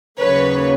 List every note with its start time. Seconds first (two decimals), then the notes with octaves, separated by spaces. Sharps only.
0.19 D#2 C#3 F#3 A#3 B4 C#5